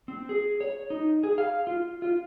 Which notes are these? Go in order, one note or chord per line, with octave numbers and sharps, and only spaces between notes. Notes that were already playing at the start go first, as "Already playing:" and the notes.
C4
G#4
C#5
D#4
G#4
F5
F4
F4